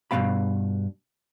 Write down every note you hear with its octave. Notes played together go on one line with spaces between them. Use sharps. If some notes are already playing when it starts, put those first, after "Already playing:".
G2 B2 F#3 A#3 F5 B5